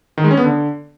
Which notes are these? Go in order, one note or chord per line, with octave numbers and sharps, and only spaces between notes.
D#3
G#3
C#4
B3
D3